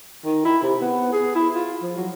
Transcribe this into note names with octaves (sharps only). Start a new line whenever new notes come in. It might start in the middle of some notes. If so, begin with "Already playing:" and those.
D#3
E4
C3
B3
G#4
E4
F4
F3
F#3